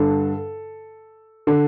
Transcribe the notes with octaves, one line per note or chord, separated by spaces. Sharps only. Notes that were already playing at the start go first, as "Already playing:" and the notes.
Already playing: G2 D3 A4
D3